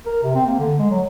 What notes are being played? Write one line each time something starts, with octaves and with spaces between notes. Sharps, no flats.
A#4
C3
C4
A#3
D3
G#3
F#3